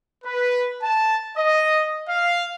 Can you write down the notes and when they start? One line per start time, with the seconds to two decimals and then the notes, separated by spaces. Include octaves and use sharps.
0.24 B4
0.82 A5
1.37 D#5
2.08 F5